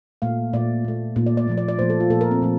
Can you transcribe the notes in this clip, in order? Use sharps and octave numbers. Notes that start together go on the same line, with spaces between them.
A#2 A3 F5
A#2 A3 D5
A#2 A3
A#2 A3
D5
D5
A#2 F3 A3
D5
D5
A#2 F3 A3 C5
A4
F4
A#2 F3 A3 A4
A#4
C4
A#2 F3 A3